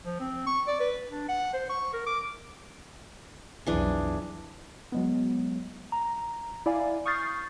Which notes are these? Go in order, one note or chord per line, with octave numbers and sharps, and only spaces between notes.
F3
C4
C#6
D5
B4
D4
F#5
C5
C#6
A#4
D6
B1 F2 E3 D4 G#4
F#3 G#3 B3
A#5
E4 D5 F5 G#5
C#6 D#6 F6 G6 A6 C7